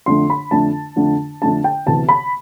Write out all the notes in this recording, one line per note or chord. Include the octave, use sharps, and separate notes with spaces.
F2 D3 A3 D4 C6
B5
F2 D3 A3 D4 A5
F2 D3 A3 D4
F2 D3 A3 D4 A5
G5
D2 C3 E3 B3 A5
B5